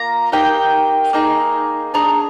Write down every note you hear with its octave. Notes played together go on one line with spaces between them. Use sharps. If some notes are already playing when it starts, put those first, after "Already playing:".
Already playing: A#3 F4 A#5
A#3 D#4 G4 G5
A#3 D#4 G#4
D4 G#4 A#5